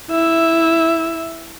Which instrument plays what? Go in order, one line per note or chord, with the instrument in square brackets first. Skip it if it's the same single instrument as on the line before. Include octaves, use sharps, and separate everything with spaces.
[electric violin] E4 E5